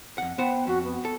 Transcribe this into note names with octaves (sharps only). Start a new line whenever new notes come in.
F2 F#5
B3 C5 F#5 G5
F2 F#4
B3
A4